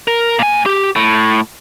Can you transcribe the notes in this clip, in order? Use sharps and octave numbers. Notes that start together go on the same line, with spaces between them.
A#4
A#2 G#5
G4
A2